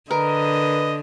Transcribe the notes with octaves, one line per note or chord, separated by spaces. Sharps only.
D3 A#4 B4 D#5